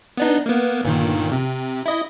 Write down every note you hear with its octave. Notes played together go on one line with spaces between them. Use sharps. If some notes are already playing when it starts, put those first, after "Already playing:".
B3 D4 D#4
A#3 B3
G1 A#2 D#3
C3
E4 D#5